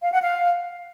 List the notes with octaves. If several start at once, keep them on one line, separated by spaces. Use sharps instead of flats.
F5
F#5
F5